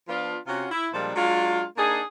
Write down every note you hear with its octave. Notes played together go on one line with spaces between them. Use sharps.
F3 B3 D4 F4
C3 C#4 F4 F#4
E4
A#2 F3 G3 G#3 A#3 D4
F#3 G#3 D4 F4
A#3 D4 D#4 G#4